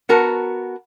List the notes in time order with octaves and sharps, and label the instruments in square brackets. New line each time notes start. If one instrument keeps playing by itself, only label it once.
[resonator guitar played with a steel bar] B3 F#4 A#4 A5